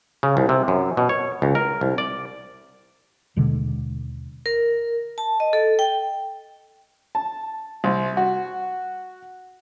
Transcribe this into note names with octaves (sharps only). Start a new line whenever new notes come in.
C#3
C2
C3
F#2
B2
C#5
C#2
A#4
C2
D5
D#2 B2 D3 G#3
A#4
A5
D#5
A4
G5
A5
C2
F#4